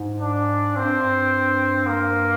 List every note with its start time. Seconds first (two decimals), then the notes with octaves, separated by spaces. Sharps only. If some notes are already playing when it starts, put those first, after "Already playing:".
Already playing: G#2
0.20 D4
0.76 G2 C4
0.96 G2
1.87 A#3